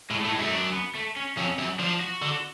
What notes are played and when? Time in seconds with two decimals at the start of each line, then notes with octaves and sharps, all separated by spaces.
0.10 A2 G#3
0.21 A3
0.25 A2
0.32 G#3
0.39 F#2 A3
0.53 D4
0.73 B3
0.95 A3
1.16 C#4
1.37 F2 C#4
1.58 F#2
1.79 F3 D4
2.01 F#4
2.22 D3